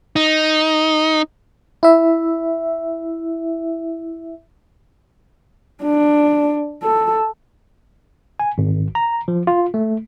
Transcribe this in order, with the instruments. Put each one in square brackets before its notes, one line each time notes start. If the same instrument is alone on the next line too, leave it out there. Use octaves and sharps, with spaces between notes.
[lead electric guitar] D#4
[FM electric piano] E4 E5
[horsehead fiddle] D4
A4
[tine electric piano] G#5
G#1
A#5
F3
F4
A3